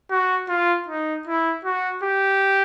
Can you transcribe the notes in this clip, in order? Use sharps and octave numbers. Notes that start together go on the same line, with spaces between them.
F#4
F4
D#4
E4
F#4
G4